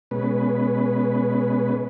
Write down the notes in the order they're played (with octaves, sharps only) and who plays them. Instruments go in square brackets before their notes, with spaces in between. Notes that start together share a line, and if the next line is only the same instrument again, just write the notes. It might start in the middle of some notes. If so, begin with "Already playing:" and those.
[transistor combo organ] B2 G#3 C#4 B4